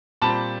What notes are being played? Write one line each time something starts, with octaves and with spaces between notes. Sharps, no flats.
A#2 G3 C4 A5 B5